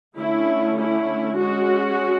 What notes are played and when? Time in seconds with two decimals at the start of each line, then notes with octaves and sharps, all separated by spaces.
0.17 D3 A3 C#4 E4
0.78 E4
1.37 G#3 C#4 F#4